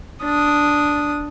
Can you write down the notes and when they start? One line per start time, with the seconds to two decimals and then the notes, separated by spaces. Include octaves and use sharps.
0.23 D4 D#6